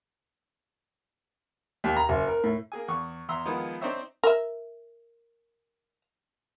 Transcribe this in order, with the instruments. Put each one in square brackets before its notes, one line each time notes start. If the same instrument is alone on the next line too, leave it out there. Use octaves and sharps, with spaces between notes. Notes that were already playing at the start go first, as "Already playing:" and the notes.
[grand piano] D#2
A#5
F#1
A#4
A2
[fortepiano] A#3 G#4 G#5
E2 C#6
E2 E5 A#5 C6 E6
D#3 F3 G#3 B3 D#4 E4
C4 D4 D#4 C5 C#5 E5
[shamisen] A#4 E5